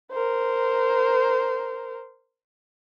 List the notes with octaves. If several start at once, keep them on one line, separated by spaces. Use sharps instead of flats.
A#4 C5